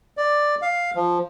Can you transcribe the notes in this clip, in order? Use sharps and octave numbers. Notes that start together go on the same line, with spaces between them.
D5
F5
F3